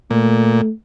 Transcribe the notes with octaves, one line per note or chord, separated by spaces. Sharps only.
A#2 A3